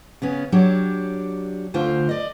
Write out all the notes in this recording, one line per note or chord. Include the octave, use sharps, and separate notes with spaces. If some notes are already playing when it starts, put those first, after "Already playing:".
C#3 B3 C#4
F#3 D4 G4 C#5
D2 D3 F4 C5
D5 D#5